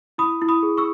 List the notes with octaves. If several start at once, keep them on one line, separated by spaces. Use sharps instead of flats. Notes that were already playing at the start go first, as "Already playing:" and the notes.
E4 B5 D#6
E4
B5 D#6
G#4
C#6 E6